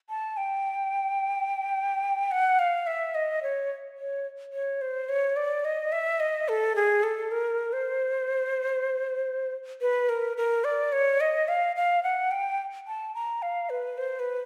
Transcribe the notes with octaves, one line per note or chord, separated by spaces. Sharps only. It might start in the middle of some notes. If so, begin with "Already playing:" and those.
A5
G5
F#5
F5
E5
D#5
C#5
C#5
C#5
C5
C#5
D5
D#5
E5
D#5
A4
G#4
A4
A#4
C5
B4
A#4
A#4
D5
C#5
D#5
F5
F5
F#5
G5
A5
A#5
F5
B4
C5
B4